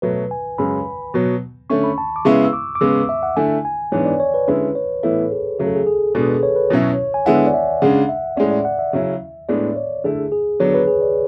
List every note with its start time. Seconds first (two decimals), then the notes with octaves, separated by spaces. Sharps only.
0.02 B2 F#3 A3 B4
0.31 G#5
0.58 F#2 C#3 G#3 C#4 B5
1.14 B2 F#3 B3
1.70 D3 A3 C#4 C#6
1.84 B5
1.98 A5
2.16 D6
2.25 C#3 G#3 B3 E4 C#6
2.44 E6
2.53 D6
2.75 D6
2.81 C#3 G#3 B3 E6
3.09 E5
3.23 F#5
3.36 D3 A3 E4 G#5
3.65 G#5
3.92 G#2 E3 B3 D4 C#5
4.05 D5
4.20 C#5
4.34 B4
4.48 D3 G#3 C#4 E4 B4
4.75 C#5
5.03 A2 E3 B3 E4 A4
5.32 G#4
5.59 C#3 F#3 A3 G#4
5.67 A4
5.76 G#4
5.87 G#4
6.14 B2 G#3 B3 D4 A4
6.28 B4
6.43 C#5
6.56 B4
6.70 B2 F#3 C#4 E4 C#5
7.14 G#5
7.26 D3 G#3 B3 E4 F#5
7.46 D5
7.54 E5
7.82 C#3 G#3 D4 F#5
8.09 E5
8.37 A2 G#3 C#4 D5
8.51 D5
8.65 F#5
8.79 E5
8.93 C#3 F#3 C#4 E4
9.49 A2 G#3 B3 D4 D5
9.76 C#5
10.04 D3 A3 E4 G#4
10.19 G#4
10.32 G#4
10.60 D3 F#3 B3 D4 C#5
10.74 B4
10.87 G#4
11.02 D5